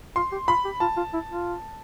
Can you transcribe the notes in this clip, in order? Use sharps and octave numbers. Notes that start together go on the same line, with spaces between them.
F4 C6
G4
F4 B5
G4
F4 A5
F4
E4
F4